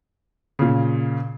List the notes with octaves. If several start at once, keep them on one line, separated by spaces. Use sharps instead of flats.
A#2 C#3